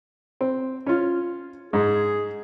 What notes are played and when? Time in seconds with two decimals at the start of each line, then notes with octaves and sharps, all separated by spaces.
0.41 C4
0.86 C#4 F4
1.73 G#2 G#4